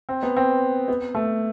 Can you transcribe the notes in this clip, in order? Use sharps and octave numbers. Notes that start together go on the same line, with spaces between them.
C4
B3
C4
B3
A3